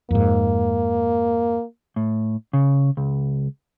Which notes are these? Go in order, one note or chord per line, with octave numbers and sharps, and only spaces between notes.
F2 G#2 A#3
A2
C#3
C#2